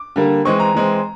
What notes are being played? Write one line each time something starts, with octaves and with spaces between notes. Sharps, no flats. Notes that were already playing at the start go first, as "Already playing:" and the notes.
Already playing: D6
D3 G3 A#3
E3 G#3 C4 C#6
A#5
E3 G#3 C4